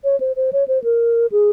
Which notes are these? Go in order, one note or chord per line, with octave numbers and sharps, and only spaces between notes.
C#5
C5
C5
C#5
C5
A#4
G#4